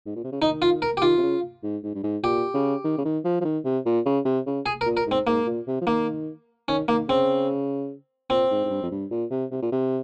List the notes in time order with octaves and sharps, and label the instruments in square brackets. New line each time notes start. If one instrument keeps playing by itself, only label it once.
[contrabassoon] G#2
A#2
C3
C#3
[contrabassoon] D#3 [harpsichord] D#4
[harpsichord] F4
A#4
G4
[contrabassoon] D#3 [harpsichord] F4
[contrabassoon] C3
C#3
G#2
G#2
G2
G#2
[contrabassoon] A#2 [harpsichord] G4
[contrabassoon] C#3
D#3
C#3
D#3
F3
F3
D#3
C3
A#2
C#3
C3
C#3
[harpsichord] G#4
A#4
[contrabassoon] A#2
[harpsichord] A#4
[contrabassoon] G#2 [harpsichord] C4
[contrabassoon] G#2 [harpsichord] A#3
[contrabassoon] A#2
C3
F3
[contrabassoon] D#3 [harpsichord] A#3
[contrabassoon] D#3 [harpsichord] C#4
[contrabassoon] D#3 [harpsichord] A#3
[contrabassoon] C#3 [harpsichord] C4
[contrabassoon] A#2 [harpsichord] C4
[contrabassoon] G#2
G#2
G2
F2
G2
A#2
C3
C3
A#2
C3